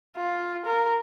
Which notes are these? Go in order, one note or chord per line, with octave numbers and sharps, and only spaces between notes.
F4
A#4